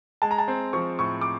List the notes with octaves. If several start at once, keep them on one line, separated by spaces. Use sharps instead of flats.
G#3 A5
A#5
A5
C4
F3 C#6
A2 C#6
D6